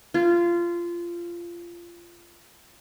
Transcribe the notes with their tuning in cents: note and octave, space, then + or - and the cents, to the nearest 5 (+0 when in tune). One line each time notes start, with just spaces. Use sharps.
F4 -20